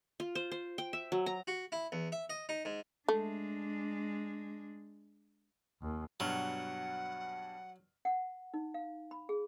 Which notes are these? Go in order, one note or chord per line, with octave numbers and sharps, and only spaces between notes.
F4
C5
C5
G5
E5
F#3
A#5
F#4
E4
E2
E5
D#5
D#4
G#2
G#3 A3 D4
D#2
G2 B2 F#3 F#5 F6
F#5
D#4
F5
B5
G#4